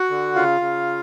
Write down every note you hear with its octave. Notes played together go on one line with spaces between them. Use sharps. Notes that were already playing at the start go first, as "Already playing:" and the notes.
Already playing: F#4 F#5
D3
C#3 F4 F5
C#3